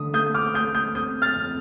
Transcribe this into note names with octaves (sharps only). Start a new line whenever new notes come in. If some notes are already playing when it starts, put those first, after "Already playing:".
Already playing: D3 A3 D#6
A3 D#6 G6
D6 F6
A3 D#6 G6
D#6 G6
C4 D#6 G6
F6 A6
F2